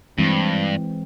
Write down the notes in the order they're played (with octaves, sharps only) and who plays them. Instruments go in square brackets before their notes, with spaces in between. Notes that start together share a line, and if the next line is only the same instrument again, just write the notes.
[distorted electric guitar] G2 [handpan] E3 G#3 C4